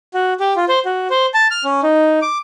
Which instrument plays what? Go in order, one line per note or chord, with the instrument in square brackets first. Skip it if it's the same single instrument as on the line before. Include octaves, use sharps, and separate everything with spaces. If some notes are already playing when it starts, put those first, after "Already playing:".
[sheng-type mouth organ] F#4
G4
F4
C5
F#4
C5
A5
F6
C#4
D#4
D6